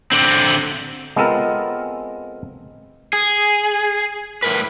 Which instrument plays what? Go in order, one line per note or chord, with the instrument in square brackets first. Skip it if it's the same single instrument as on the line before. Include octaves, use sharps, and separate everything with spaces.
[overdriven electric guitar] D3 C4
[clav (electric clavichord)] G#3 B3 C4 F4 A4 A#4
[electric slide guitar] G#4
A2 A#4 B4